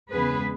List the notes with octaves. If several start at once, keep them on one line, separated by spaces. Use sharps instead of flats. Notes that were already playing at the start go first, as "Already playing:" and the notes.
E2 C#3 G#3 B3 G#4 B4